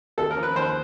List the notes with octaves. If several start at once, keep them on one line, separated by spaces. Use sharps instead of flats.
D#2 A4
A#4
F3
B4
D#2 C5